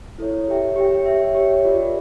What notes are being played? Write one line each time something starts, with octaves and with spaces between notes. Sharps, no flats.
E4 A4 C#5
G4 C#5 E5 G5
G4 C#5 E5 G5
G4 C#5 E5
G4 C#5 E5
F4 A#4 D5